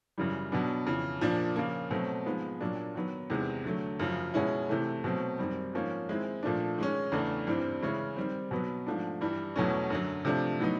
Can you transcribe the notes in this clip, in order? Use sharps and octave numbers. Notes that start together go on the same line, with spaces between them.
F#2 C#3 E3 G3
B2 F#3 B3 D4
F2 C#3 E3
A#2 F3 A#3 D4
C#3 F3 A#3
B2 F#3 A3 C4
G#2 F3 G#3 B3
A#2 F#3 A#3 D4
D#3 F#3 B3
E2 C3 D#3 G#3
D3 F#3 A3
F#2 C#3 F3
B2 G#3 C#4 E4
C3 E3 A3
B2 F#3 A3 C4
F#2 D#3 G3 C4
G#2 F3 A#3 C#4
D#3 G#3 C4 E4
A#2 F3 A3 D4
D#3 G#3 C#4
E2 C#3 E3 A3 D4
G2 E3 G3 C4
C#3 E3 G#3 C#4 E4
D#3 G3 C4
B2 F#3 B3
G#2 F3 A3 D4
G2 E3 G3
E2 B2 F#3 A3 C#4
F#2 D3 F#3
C3 F3 A3 D4
A2 F#3 B3 D#4